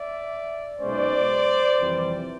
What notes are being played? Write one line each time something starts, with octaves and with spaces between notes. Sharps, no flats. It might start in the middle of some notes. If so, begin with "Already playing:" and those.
Already playing: D5 E5
B1 B2 G#3 C#4 C5 D5
F2 C3 E3 G3